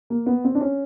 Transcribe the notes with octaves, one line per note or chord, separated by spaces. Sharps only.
A#3
B3
C4
D4
C#4